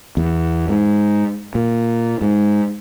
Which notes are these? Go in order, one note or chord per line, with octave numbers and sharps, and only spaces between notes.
E2
G#2
A#2
G#2